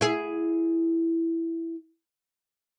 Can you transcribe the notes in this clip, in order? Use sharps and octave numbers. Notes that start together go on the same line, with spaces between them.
E4 G#4